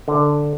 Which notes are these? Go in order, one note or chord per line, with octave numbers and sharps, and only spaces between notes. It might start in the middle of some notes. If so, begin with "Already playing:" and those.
D3